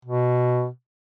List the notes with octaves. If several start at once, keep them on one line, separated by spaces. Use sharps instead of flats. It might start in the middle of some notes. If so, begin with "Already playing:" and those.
B2